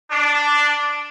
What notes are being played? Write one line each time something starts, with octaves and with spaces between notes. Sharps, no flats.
D4